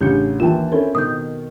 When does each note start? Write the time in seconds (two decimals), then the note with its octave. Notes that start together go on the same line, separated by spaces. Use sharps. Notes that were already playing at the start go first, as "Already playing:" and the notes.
0.01 A1 C#3 D4 G4 G6
0.40 D#2 E3 F4 G5 A5
0.72 C4 C#4 E4 A4 A#4
0.95 B2 D#3 C4 D#6 G6